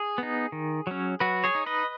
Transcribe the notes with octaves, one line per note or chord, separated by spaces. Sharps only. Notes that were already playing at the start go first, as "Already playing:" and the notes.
Already playing: G#4
B3 D#4
D#3
F#3 C#4
F#3 F#4 B4
G#4 C#5
D#4
B4 D#5